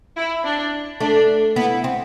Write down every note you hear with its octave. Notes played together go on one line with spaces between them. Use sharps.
E4
D4
A3 D4
B3 E4
C4